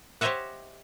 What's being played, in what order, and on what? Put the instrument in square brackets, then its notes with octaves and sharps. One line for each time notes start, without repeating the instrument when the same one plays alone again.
[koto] G4 C5 C#5 D#5 E5 F#5